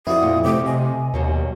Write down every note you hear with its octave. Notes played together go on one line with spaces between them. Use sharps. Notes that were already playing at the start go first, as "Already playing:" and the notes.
F2 E4 F#4 D5 D#6
A#2
C3 A3 C4 D6
D#5 G#5
D#2 B2 F#3 G3